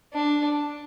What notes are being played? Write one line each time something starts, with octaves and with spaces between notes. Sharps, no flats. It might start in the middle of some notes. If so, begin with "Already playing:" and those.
D4